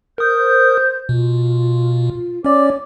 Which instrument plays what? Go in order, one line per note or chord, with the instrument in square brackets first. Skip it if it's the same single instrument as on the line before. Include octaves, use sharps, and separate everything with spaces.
[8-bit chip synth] A#4 D#6 [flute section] C5 G6
[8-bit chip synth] B2 [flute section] F4
[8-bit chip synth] C#4 D5 [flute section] C#5 D6